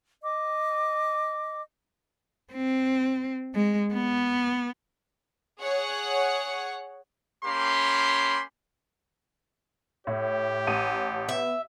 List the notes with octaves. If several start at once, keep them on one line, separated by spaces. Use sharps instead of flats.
D#5 D6
C4
G#3
B3
G#4 C#5 F#5
A#3 C#4 G4 B5 C6
A2 G4 C#5
A1 D#7
B3 E5